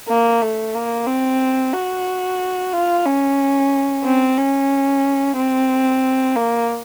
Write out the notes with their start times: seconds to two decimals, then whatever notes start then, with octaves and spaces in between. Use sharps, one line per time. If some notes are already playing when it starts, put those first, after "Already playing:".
0.09 A#3
0.42 A3
0.74 A#3
1.07 C4
1.74 F#4
2.73 F4
3.06 C#4
4.05 C4
4.37 C#4
5.37 C4
6.36 A#3